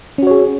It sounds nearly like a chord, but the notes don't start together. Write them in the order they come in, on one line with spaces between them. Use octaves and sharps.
C#4 F#4 C#5 G#4